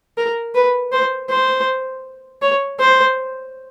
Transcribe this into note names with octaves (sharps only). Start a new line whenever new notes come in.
A#4
B4
C5
C5
C#5
C5